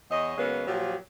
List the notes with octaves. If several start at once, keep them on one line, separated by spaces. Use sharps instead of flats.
E2 C#5 D#5
C#3 F#3 G#3 A#3 B3
A#2 F3 F#3 A#3 G4